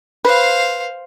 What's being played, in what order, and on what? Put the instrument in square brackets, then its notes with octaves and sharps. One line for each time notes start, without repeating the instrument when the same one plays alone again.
[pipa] B4 [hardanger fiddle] C5 F5